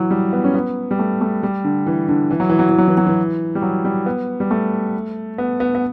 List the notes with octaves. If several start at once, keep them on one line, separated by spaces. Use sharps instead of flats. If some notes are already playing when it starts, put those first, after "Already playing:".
Already playing: E3 F#3
G3
B3
C#4
B3
G3
A3
A3
G3
D3
E3
D3
E3
F#3
E3
F#3
E3
F#3
E3
F#3
E3
G3
F#3
G3
B3
G3
A3
B3
B3
B3